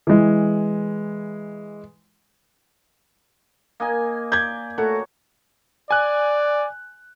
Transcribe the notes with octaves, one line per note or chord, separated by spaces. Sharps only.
E3 G#3
A#3 D#5 G#5
D5 G6 G#6
A3 F#4 C#5 A#5
D5 G#5 F#6